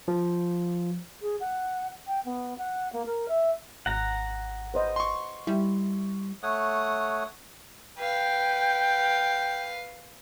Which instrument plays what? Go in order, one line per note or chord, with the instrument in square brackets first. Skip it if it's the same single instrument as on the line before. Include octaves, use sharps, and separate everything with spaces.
[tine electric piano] F3
[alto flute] G#4
F#5
G5
B3
F#5
A#3
A#4
E5
[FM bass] G#1 [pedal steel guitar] F#5 A#5
[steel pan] B4 C5 D#5
[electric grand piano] C6 C#6
[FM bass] G3 [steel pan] E4
[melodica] A3 C#5 F#5 D#6
[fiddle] B4 F5 [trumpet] G5